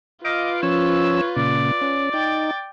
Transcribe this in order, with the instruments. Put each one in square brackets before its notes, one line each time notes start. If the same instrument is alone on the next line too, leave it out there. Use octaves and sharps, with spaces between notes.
[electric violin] F4 B4 [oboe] D#5 [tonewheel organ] F5 D6
[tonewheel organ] F3 C#4 E6 [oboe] C#5
[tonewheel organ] A#2 C#3 [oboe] D5
[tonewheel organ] C#4
[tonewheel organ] D#4 [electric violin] G5 A6